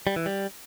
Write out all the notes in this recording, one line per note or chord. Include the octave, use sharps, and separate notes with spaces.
G3
E3
G3